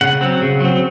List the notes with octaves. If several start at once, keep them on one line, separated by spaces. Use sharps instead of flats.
C#3 F#5
F#3 C4
C#3
F#3 C4